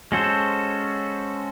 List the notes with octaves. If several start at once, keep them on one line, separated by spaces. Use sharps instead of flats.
G#3 C#4 F#4 A4 C5